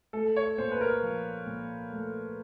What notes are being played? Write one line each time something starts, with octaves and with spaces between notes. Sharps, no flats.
A3 A4
C#5
A#2 C5
B4
A#4
F3
A#2
A3